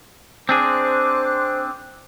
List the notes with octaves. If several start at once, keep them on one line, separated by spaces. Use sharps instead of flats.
C4 D4 G#4 C5 D6 F#6